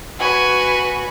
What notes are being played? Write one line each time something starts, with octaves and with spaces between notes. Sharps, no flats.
F#4 B4 G#5